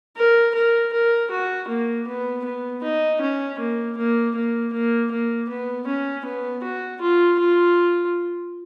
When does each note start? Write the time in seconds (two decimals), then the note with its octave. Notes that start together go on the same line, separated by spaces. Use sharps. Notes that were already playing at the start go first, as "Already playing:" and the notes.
0.16 A#4
0.55 A#4
0.93 A#4
1.30 F#4
1.68 A#3
2.07 B3
2.44 B3
2.83 D#4
3.21 C#4
3.59 A#3
3.97 A#3
4.35 A#3
4.73 A#3
5.11 A#3
5.49 B3
5.87 C#4
6.25 B3
6.63 F#4
7.01 F4
7.39 F4